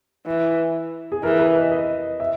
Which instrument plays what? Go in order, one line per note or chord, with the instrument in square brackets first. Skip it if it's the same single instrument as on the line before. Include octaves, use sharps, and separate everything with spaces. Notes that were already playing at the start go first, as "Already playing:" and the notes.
[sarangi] E3
[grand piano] G#4
[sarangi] E3 [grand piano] A#4
[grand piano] B4
D#5
D#5
E5